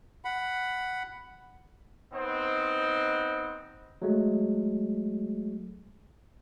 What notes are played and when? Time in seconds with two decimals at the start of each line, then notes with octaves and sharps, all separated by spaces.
0.25 F#5 B5
2.13 B3 C4 D#4 C5
4.02 F#3 G#3 A3